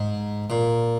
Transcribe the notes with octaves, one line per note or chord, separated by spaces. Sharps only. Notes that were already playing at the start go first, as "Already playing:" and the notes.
Already playing: G#2
A#2